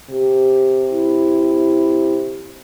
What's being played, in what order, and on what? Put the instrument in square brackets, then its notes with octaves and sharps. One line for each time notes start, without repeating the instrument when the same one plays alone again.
[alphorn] C3 [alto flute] G4
[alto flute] E4